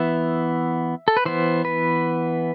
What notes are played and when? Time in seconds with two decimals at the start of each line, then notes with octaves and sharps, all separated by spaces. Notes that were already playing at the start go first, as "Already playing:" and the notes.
Already playing: E3 B3 E5
1.08 A4
1.17 B4
1.25 E3 B3 C5
1.65 B4